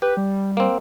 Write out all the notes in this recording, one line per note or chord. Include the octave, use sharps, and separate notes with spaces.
G4 B4
G3
A#3 C4